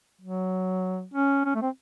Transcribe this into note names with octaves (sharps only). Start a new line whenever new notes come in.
F#3
C#4
C#4
A3
C4